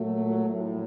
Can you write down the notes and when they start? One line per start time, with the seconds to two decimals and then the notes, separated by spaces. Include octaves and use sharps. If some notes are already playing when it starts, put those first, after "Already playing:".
Already playing: A#2 F#3 A3
0.47 A#1 A2 F#3